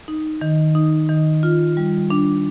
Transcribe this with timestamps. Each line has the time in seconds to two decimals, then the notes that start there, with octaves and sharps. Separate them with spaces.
0.08 D#4
0.41 D#3
0.75 D#4
1.09 D#3
1.43 F4
1.77 G3
2.10 D4